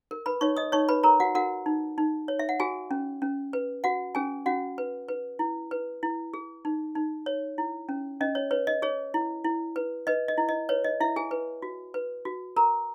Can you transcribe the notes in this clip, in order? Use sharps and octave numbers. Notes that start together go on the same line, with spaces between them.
A#4
B4 B5
D#4 C#5 C#6
D#5 D#6
D#4 C#5 C#6
B4 B5
A#4 C#5 A#5
F#4 F#5
F#4 A#4 F#5
D#4
D#4
C#5
E5
F#5
F#4 G#4 G#5
C#4
C#4
B4
F#4 F#5
C#4 G#4 G#5
C#4 F#4 F#5
B4
B4
E4
B4
E4
G#4
D#4
D#4
C#5
E4
C#4
C#4 D#5
C#5
B4 C#5
D#5
G#4 C#5
E4
E4
B4
B4 D#5
D#5
E4
D#5
B4 C#5
D#5
E4 E5
G#4 G#5
B4
F#4
B4
F#4
A#4 A#5